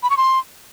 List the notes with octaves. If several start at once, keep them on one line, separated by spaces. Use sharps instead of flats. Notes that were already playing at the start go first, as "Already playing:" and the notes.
B5
C#6
C6